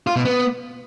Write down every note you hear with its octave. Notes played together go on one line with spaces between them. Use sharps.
F4
B2
B3